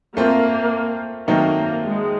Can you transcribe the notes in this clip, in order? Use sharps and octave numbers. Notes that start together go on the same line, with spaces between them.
A3 A#3 C4 F4
D#3 F#3 A3 A#3 C4 D#4
G#3